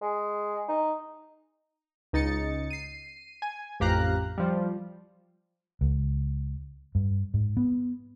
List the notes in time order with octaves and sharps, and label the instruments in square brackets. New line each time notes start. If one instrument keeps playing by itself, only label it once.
[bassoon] G#3
D#4
[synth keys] C#2 D#4 A6 C#7
C7 D#7
G#5
A1 F2 G4 F5 A#5 F#6
F3 G3
[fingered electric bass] C#2
G2
G#2
B3